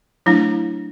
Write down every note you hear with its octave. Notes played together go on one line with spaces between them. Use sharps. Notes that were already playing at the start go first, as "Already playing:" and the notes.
F#3 A3 D4 E4